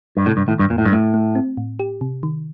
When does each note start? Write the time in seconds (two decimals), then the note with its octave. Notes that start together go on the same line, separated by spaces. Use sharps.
0.17 G2
0.26 A2 C3
0.37 G2
0.48 A2 D#3
0.59 G2
0.70 F2 A#2
0.78 A2
0.85 G2
0.92 A2 A3
1.14 A3
1.35 C4
1.57 A2
1.79 G4
2.01 C3
2.23 D#3